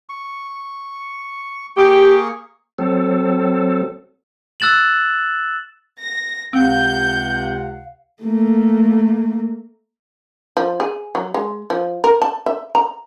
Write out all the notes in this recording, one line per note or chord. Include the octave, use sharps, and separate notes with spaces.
C#6
A#3 G4 G#4 C#6
F#3 C4 A4
E6 F#6 A6 E7 F#7
A#6
C#2 C3 C4 F5 F#5 G6
A3 A#3
F3
G#4
F#3
G#3
F3
A#4
A5
E5
A#5